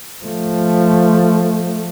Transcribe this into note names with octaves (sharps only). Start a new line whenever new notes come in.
F3 A3